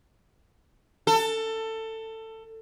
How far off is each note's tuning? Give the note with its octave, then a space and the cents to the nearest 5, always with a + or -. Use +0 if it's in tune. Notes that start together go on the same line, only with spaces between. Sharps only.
A4 +20